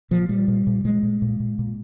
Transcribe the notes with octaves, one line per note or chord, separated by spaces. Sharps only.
A#2 F3
A#2 G3
A#2
A#2
A#2 G#3
A#2
A#2
A#2
A#2